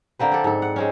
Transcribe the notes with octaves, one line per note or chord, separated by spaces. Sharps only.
D3 A#3 C4 B4
D4 A4
G#2 A4
F#5
G#3 C4 C#4